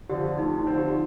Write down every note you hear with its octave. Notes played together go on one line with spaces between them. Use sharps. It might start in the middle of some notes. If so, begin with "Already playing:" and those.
D3 F3 C4 G4
D2 D#4
D#4
D3 F3 C4
G4